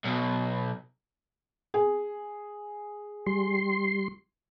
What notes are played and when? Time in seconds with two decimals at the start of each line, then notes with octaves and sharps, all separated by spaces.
0.05 B1 B2
1.74 G#4
3.26 G3 C6